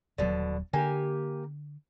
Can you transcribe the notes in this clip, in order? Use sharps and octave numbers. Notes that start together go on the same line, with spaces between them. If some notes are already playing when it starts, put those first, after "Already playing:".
D#1 B2 D3 F#3
D3 A#3 G4 G#5